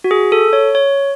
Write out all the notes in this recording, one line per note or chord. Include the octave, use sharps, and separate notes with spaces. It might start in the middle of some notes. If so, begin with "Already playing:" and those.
F#4
G#4
A4
C#5
C#5